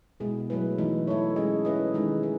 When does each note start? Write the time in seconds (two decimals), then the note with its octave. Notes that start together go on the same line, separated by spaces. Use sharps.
0.20 B2 G#3 B3 E4 G#4
0.50 F#3 A3 E4 B4
0.78 E3 A3 D#4
1.07 A3 E4 A4 C#5
1.36 G#3 C#4 G#4 D#5
1.65 C#4 E4 B4 D#5
1.94 D#3 G#3 D#4 G#4
2.23 B4